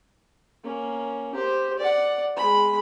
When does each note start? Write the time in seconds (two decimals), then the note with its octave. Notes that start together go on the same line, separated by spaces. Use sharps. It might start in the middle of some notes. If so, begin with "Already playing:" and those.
0.64 A#3 C#4
1.34 G4 C5
1.79 D5 F#5
2.37 G#3 B5